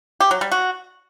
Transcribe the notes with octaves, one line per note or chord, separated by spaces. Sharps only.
G4
F#3
G3
F#4